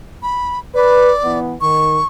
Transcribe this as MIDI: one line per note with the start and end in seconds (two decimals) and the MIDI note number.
0.22 0.59 83
0.75 1.10 71
0.75 1.38 74
1.23 1.54 52
1.23 1.54 59
1.61 1.98 51
1.61 2.07 85